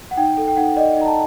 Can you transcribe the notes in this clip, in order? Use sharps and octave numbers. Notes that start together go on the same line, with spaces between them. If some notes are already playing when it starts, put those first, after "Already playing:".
F#5
D#4 G5
A4
G5
D#4 F#5
D5 D#5
D#4 A#5
A5